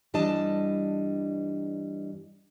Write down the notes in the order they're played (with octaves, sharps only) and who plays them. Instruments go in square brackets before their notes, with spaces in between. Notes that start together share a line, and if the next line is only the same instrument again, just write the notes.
[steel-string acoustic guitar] G2 E3 G3 D4 D#5 A5